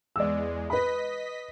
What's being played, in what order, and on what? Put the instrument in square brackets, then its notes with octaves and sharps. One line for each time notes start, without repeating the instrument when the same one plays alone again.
[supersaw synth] E2 G#3 [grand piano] D5 E6
[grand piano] B4 B5 [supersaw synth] D#5 B6